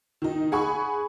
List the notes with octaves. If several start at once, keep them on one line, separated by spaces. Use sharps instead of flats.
D#3 D#4
G#4 F#5 G#5 B5 C#6